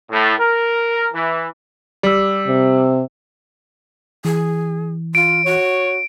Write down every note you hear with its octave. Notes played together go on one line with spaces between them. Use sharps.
A2
A#4
E3
G3 G4 E6
C3
E3 G#4
F4 D7
F#4 C#5